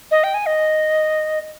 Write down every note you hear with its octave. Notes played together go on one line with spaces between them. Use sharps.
D#5
G5
G#5
D#5